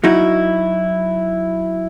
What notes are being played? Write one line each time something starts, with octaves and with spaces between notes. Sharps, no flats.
F#3 D#4 E4 F#4